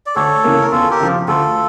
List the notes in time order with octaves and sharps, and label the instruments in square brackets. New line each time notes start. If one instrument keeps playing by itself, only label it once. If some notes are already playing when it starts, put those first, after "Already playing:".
[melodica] D5
[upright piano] D2 [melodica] A4 C#5
[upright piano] C#3 E3 A#3
[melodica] A#4
[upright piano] E2 [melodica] F4 A4
[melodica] G4 A#4
[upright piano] C#3 F3
[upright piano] D2 [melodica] F4 A4